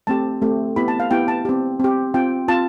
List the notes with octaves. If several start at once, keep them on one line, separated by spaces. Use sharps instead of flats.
A3 C4 G4 A5
A3 C4 G4
B3 E4 G4 B5
A5
F5
B3 E4 G4 G5
A5
C4 G4
C4 G4
C4 F4 G5
C4 F4 A5